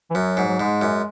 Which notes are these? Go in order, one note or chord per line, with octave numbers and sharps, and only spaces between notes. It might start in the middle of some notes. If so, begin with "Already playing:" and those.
E3
F#2 F#3
G#2
F#3
G#2 G#3
F#2